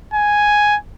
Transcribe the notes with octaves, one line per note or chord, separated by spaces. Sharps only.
G#5